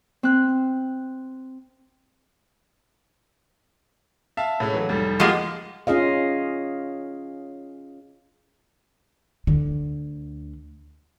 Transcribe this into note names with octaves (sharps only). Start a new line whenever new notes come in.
C4 F#6
E5 F5 A5
A2 G#3 C#4
E3 F#3 A3
F1 G3
F3 G#3 A#3 F#4 G4
C#4 F4 G#4 D#5 F5
D2 D3